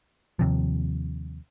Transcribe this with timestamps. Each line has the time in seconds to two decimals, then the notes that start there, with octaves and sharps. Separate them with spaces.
0.39 D#2 C3 F3